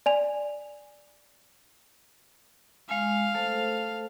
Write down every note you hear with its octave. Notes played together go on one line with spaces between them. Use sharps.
D5 G#5 F7
G#3 F5 G#5
A3 A4 C5